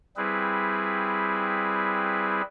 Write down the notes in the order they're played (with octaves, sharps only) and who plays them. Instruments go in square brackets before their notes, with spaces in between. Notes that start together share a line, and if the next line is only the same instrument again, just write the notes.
[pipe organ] G3 C4 E4 G#4 B4